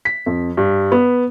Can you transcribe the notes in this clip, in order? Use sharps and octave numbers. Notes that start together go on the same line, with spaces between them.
B6
F2
G2
B3